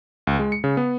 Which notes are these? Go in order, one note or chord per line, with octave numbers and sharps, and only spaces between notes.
C#2
G#3
C#7
C#3
B3